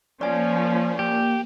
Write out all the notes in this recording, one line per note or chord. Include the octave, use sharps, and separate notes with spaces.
F3 A#3 C#4 D5 G#5
G4